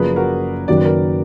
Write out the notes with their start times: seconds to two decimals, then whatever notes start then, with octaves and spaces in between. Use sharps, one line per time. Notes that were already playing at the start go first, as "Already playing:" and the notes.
Already playing: F#1 F#2 F3 G#4 A#4 B4 D5
0.16 F#4 A#4
0.68 F#1 F#2 D#3 F#3 D5
0.77 B4
0.85 A#4 D5